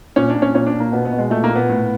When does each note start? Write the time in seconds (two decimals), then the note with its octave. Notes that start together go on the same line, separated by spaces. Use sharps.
0.16 A#2 C#4
0.30 D4
0.35 A#2
0.42 C#4
0.54 A#2 C#4
0.66 D4
0.73 A#2
0.80 A#3
0.92 B2 B3
1.05 B3
1.12 B2
1.18 G#3
1.30 A#2 A3
1.44 A#3
1.50 A#2
1.55 B3
1.69 A2